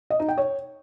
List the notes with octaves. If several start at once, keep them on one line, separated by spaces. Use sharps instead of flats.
D#5
D#4
G5
C#5